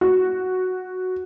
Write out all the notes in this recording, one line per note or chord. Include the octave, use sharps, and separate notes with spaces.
F#4